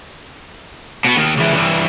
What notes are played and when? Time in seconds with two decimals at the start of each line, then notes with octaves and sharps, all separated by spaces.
1.05 B2 B3
1.17 D#2 D#3
1.36 C#2 E3
1.53 G2 E3